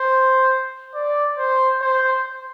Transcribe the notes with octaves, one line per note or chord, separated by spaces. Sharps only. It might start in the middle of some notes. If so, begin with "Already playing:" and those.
Already playing: C5
D5
C5
C5